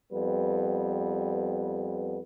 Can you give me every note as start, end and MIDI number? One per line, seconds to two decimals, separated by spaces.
0.13 2.19 41
0.13 2.19 55
0.13 2.19 59
0.13 2.19 71